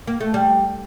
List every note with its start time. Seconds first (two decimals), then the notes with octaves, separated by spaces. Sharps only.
0.07 A#3
0.20 A3
0.34 G3